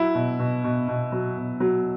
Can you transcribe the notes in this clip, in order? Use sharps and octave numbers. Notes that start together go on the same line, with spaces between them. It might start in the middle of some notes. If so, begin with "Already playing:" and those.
Already playing: F#3 E4
B2
B2
B2
B2
F#3
B2
F#3